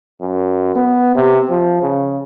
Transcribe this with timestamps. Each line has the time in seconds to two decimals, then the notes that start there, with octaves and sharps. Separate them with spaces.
0.21 F#2
0.75 B3
1.15 C3
1.50 F3
1.82 C#3